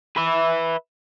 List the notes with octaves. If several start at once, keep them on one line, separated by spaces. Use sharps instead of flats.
B4 E5